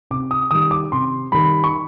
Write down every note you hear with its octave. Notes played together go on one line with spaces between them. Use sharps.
C3 D6
D#6
D#3 G3 D#6
D6
C3 C6
D#3 G3 B5
C#6